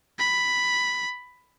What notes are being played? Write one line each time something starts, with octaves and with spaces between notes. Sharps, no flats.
B5